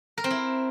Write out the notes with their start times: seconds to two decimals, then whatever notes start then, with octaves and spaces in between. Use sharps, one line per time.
0.18 A#4
0.24 C4
0.31 E4